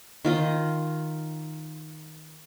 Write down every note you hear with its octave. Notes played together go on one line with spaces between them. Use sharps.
D#3 F4 D#5